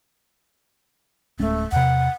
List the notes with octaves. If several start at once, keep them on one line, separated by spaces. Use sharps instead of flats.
D1 G#3 A3 C#4
E2 C3 F#5